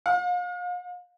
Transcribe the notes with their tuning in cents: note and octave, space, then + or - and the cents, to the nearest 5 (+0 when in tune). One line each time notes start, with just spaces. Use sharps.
F5 +40